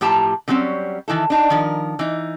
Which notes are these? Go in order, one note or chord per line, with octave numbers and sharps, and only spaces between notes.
A2 F3 G4 A5 A#5
D3 F#3 G3 C4 C#4
D#3 E3 E4 A4
D4 D#4
D#3 F3 A#4
E3 D#4